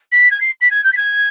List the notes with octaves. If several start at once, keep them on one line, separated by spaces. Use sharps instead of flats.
B6
G#6
C7
B6
G#6
G6
B6
G#6